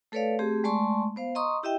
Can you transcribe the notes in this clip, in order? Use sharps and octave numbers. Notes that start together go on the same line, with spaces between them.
A3 A4 B4 C#5 D5 F5
A3 C4 G4 G#4
G#3 A3 D5 A5 C6 C#6
B3 C5 F5
D#5 A#5 C6 C#6 D#6
E4 G4 D#5 E5 G5